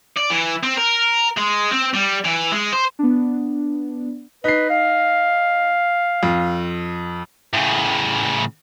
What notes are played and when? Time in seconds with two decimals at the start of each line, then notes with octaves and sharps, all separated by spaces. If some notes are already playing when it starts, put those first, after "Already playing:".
0.17 D5
0.30 E3
0.63 C4
0.77 A#4
1.37 G#3
1.71 C4
1.94 G3
2.24 E3
2.52 G#3
2.73 C5
2.99 B3 D4
4.44 D#4 B4 C7
4.70 F5
6.23 F2
7.53 A2 C#3